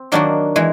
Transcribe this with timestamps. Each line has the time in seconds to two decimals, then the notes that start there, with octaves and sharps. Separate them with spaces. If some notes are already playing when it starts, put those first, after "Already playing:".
Already playing: C4
0.12 D#3 F#3 A#3 D4 F#4
0.56 E3 G#3